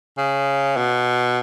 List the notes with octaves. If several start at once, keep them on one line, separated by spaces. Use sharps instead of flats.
C#3
B2